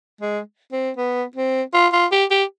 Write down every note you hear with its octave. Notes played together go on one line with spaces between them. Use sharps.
G#3
C4
B3
C4
F4
F4
G4
G4